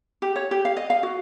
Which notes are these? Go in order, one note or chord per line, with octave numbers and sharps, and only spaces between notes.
G4
C#5
G4
F5
D#5
F5
F#4